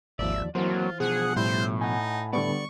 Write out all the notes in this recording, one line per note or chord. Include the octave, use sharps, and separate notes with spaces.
G#1 D#2 F3 D5 E5
E3 F#3 A#3 C4 F4 F#4 C5
B2 F3 G#4 F#5
A2 G3 E4 C5
D#4 F#5 G#5
D3 G3 B3 D5 C#6